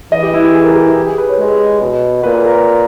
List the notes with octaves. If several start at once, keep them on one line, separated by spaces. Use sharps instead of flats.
E3 D#5
G4
E4
G4
G#4
A#4
G4
E4
G4
G#4
B4
C#5
G#3
B2
A#2 B4
B4
A#4